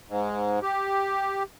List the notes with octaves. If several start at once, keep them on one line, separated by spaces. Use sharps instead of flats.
G#2
G4